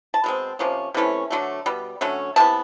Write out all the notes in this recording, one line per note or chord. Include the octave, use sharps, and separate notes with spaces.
A5
B2 G#3 C4
C3 F3 A#3 C#4
C3 E3 A3 C#4
D3 F#3 A3
B2 G3
D3 F#3 A3 C#4
C3 E3 B3 A5